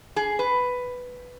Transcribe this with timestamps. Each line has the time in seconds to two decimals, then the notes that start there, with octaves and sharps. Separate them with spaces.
0.16 G#4
0.39 B4